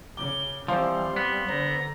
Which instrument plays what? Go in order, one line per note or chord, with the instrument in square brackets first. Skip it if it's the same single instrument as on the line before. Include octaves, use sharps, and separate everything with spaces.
[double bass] C#3 [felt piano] D6 [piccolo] G7
[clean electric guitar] E3 F3 [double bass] G3 [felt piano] C4 C5 F5 [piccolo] C6
[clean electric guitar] B3
[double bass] D3 [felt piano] C5 [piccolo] A#5